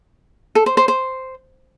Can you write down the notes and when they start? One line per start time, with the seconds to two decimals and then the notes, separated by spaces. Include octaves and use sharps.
0.55 A4
0.66 C5
0.77 C5
0.88 C5